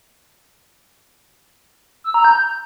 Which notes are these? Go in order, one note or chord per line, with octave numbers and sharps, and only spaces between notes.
E6
A#5
G6